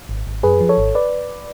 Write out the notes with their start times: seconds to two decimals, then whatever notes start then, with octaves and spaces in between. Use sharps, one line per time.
0.09 G#1
0.27 G#1
0.43 F#2 G#4 B4
0.61 F3
0.69 A4 C#5
0.78 G#1
0.95 B4 D5